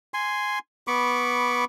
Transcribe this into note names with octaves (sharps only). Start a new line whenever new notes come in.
G#5 C6
B3 B5 C#6 D6